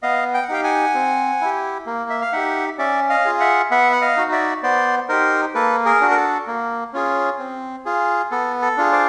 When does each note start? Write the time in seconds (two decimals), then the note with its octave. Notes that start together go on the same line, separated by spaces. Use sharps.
0.03 B3 D#5 F5
0.34 G5
0.43 F#5
0.49 D#4 G4 F5 G5
0.64 F#5 G#5
0.95 C4
1.41 E4 G4
1.86 A#3
2.10 E5
2.22 F5
2.32 D#4 G4 E5 F#5
2.78 C#4 D5 E5
3.09 D#5 F5
3.25 F4 G#4
3.40 E5 F#5
3.71 B3 E5 F#5
3.92 F#5
4.02 D#5 F5
4.17 D#4 F#4
4.32 D5 E5
4.63 B3 C5 D5
5.09 D#4 G4 A#4 C5
5.55 A#3 A4 B4
5.85 G#4 A#4
6.01 D4 F#4
6.11 A#4
6.17 A4
6.47 A#3
6.93 C#4 F4 G#4
7.39 C4
7.85 F4 G#4
8.31 B3 A4
8.62 A4
8.77 D4 F4 G#4
8.92 C5 D5